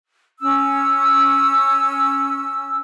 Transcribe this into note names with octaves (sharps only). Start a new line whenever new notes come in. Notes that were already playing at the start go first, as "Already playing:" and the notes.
C#4 E6